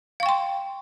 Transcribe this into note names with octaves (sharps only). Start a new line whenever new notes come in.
F5 G5 C6 C#6